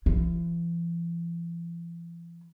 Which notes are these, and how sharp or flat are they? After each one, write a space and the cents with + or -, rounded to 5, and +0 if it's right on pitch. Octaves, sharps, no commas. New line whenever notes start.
E3 +45 E4 +45